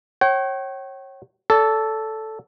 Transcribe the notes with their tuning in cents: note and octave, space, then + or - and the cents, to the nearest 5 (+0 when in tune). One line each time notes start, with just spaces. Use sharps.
C#5 -30 G5 -40
A4 +0 D5 -40